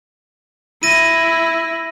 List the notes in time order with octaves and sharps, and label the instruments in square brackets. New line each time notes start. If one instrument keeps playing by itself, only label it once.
[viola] E4 [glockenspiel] A#6 D#7